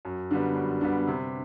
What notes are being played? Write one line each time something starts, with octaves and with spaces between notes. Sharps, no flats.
F#2
D3 G3 B3
F#2
D3 G3 B3
C3